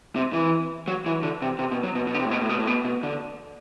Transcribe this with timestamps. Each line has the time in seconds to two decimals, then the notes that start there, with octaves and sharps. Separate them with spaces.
0.16 C3
0.33 E3
0.88 F#3
1.06 E3
1.23 D3
1.42 C3
1.59 C3
1.72 B2
1.83 F#3
1.95 B2
2.07 B2
2.14 D3
2.19 C3
2.26 A2
2.31 B2
2.41 A2
2.49 B2
2.59 A2
2.67 B2
2.85 B2
3.03 D3